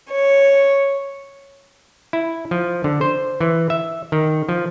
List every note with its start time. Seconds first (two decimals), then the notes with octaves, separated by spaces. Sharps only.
0.10 C#5
2.13 E4
2.51 F3
2.84 D3
3.01 C5
3.41 E3
3.70 E5
4.12 D#3
4.49 F3